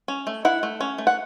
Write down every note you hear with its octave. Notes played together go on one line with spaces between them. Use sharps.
C#4
A3
E4 F#5
A3
C#4
A3
F#5